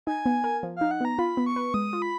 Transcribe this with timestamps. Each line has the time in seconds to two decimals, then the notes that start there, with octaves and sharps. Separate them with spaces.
0.07 D#4 G#5
0.26 B3
0.44 A#4
0.63 F3
0.76 D#4 F5
0.91 F#5
1.01 B3 A#5
1.19 F4 B5
1.37 B3
1.46 C#6
1.56 B4
1.74 G#3 D#6
1.93 F4
2.02 B5